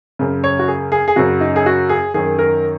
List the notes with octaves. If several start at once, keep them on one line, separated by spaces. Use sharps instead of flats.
F#2 C#3
C#5
F#4
G#4
G#4
G#4
F#2 C#3 F#4
D#4
G#4
F#4
G#4
F#2 D#3 G#4
A#4